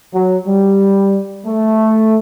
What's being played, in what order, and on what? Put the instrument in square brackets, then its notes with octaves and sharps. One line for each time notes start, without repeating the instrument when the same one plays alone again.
[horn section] F#3
G3
A3